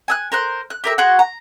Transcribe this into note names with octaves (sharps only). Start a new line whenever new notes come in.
G#5 E6 F#6
A#4 C5 F#6
F#6
G4 A#4 E5
F#4 G#4 C5 F#5
A#5